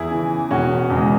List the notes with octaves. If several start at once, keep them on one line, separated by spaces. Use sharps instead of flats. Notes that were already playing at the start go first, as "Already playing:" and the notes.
Already playing: E2 E4 G#4
C#3 E3
E1 C#4 F#4
E2 C#3 G#3